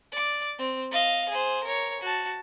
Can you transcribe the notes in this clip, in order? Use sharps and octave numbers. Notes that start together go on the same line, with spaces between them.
D5 D6
C4
D#5 F5
G#4 C5
A#4 C#5
F#4 A5